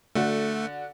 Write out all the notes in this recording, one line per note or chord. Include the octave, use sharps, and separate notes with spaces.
D3 A3 F#4